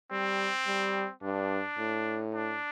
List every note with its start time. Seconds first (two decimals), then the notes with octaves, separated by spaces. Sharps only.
0.11 G3 C4
0.67 G3
1.22 G2 D4
1.79 A2
2.35 D4